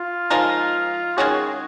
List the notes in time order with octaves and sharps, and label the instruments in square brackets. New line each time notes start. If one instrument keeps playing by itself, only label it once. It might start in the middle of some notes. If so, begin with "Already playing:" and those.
Already playing: [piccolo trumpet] F4
[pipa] F3 G#3 D#4 A#4
[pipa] D#3 G#3 C#4 F#4 [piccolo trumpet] G#4